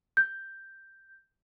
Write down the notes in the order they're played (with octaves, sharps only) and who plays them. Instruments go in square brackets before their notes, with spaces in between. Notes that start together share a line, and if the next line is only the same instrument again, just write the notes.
[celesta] G6